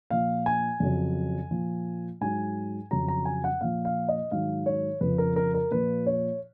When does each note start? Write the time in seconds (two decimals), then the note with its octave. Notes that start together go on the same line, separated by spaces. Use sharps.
0.10 A#2 F3 F5
0.46 G#5
0.80 F2 C#3 F#3
1.51 A#2 F3
2.21 G#2 F#3 G#5
2.91 F2 C#3 F#3 A#5
3.08 A#5
3.25 G#5
3.44 F#5
3.61 A#2 F3 F5
3.85 F5
4.08 D#5
4.31 G#2 D#3 F#3 F5
4.66 C#5
5.01 F2 C#3 F3 B4
5.18 A#4
5.36 A#4
5.54 A#4
5.71 A#2 F3 B4
6.06 C#5